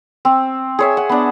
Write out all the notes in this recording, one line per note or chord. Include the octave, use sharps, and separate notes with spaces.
C4
G#4 C#5 E5
F#5
B3 D4